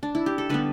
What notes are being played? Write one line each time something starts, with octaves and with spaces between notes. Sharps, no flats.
D4
E4
G4
A4
D3 G3 B3 B4